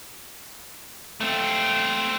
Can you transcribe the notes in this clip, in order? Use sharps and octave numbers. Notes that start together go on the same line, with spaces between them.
A3 C4